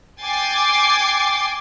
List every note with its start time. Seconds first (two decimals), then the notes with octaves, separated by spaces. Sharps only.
0.23 G5 G#5 D6 G#6 A6 C7